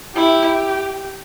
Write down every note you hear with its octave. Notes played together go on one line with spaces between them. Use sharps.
E4 G4